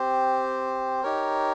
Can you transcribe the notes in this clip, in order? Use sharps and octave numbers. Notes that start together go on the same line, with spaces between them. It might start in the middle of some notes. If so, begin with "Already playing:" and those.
Already playing: C4 G4 C5
D#4 G4 A#4 C#5